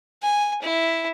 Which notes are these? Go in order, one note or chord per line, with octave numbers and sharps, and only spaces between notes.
G#5
E4